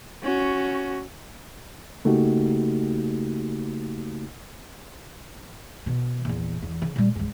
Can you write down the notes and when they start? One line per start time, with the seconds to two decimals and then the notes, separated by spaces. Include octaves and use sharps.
0.23 C#4 F#4
2.05 C#3 A3 A#3 D#4 F#4 G4
5.86 B2
6.25 A#1 E2
6.62 E2
6.82 C#3
6.96 A#2 G3
7.15 C#2 G2